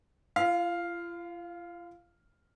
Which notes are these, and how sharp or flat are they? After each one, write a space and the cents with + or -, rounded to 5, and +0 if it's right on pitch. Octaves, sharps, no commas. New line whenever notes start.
F4 -40 F5 +0